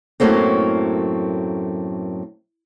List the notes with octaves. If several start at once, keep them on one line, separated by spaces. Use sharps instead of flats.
F#2 A2 F#3 A3 A#3 C4